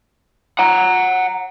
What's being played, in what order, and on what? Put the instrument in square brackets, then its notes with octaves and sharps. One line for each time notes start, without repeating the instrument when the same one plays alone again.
[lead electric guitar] F#5 A#5